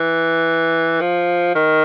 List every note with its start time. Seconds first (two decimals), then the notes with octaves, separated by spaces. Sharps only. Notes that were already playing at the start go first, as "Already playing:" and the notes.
Already playing: E3
1.01 F3
1.55 D#3